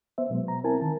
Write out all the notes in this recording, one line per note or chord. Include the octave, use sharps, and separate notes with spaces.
B3 C5 E5
B2 F#3 G#3 B3
A#5
C4 E4 A#4 G#5 A5
D#3 A5